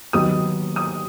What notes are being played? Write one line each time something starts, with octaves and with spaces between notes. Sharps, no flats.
D#2 D#3 F#3 B3 D#6
D#6